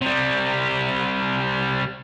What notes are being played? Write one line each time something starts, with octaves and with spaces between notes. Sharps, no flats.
C3 G3